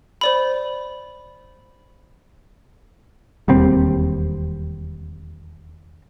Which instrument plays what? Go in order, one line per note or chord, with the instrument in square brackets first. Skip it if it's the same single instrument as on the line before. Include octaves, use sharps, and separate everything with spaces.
[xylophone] C5 D5 B5
[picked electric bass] E1 D#2 G3 C4